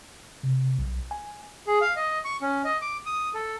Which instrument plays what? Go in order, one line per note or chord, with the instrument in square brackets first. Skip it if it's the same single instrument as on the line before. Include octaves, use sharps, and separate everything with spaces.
[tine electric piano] C3
B1
G#5
[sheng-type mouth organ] G#4
F5
D#5
C#6
C#4
D#5
D6
D#6
A4